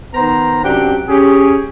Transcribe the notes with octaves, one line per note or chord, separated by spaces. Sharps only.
D#3 B3 C5 A#5
F#2 C3 D4 G4 F#5 G5
C#4 G4 G#4